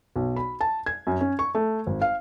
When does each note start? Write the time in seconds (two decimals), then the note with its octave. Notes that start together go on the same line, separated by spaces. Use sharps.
0.16 B1
0.36 B5
0.61 A5
0.86 G#6
1.07 F#2
1.21 C#4
1.39 C#6
1.55 A3
1.87 G#1
2.01 F5